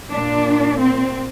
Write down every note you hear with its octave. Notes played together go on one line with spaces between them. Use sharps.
A#2 D4
C4